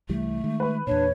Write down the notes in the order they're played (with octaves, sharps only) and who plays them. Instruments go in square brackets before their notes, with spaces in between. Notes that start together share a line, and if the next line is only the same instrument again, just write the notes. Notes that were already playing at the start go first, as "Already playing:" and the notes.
[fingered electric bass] C2 E3 G3 [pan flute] A3
[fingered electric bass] D#3 G#3
[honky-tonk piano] B4 B5
[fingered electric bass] E2 A#2 [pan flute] D4 [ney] C#5